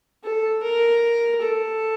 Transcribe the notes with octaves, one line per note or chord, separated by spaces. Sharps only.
A4
A#4
A4